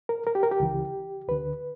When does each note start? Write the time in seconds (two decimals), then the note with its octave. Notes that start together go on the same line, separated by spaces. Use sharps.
0.09 A#4
0.27 A#4
0.35 G4
0.43 A#4
0.52 G4
0.60 C#2 C#3 E3
1.28 D2 D3 B4